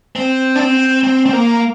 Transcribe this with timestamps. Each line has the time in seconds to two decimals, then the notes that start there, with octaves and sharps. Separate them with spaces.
0.16 C4
0.56 D4
0.59 C4
1.04 C4
1.26 C4
1.33 A#3